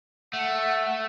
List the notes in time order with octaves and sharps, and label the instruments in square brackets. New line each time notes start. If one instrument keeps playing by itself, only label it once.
[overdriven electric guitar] A3 [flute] F#5